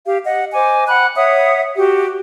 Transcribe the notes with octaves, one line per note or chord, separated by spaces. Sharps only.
G4 F5
D#5 F#5
C5 D#5 G#5 D6
F#5 G5 B5 F#6
C#5 E5 F#5 D#6
F#4 G4